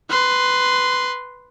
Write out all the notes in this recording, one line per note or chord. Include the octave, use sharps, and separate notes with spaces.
B4 C6